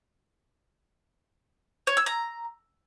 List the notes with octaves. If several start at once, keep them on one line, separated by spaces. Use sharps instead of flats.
C#5
E6
A#5